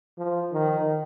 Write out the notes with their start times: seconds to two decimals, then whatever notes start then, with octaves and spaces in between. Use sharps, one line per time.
0.18 F3
0.52 D#3